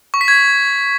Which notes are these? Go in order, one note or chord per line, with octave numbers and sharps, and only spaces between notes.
C#6
B6
G#6